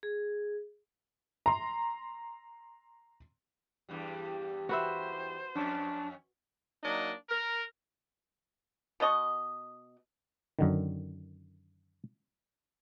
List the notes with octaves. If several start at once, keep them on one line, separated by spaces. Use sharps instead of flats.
G#4
A#5 C6
E2 G2 G3
F#4 B4 C5 E5
F2 C#4 D4
F#3 A#3 D4 D#4 D#5
A#4
B2 B3 D#5 C#6
F#2 D3 D#3